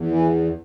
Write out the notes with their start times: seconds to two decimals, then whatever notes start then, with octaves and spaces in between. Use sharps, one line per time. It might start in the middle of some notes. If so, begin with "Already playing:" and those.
Already playing: E2
0.11 E3